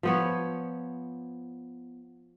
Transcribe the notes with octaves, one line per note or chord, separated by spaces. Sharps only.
F3 B3 C#5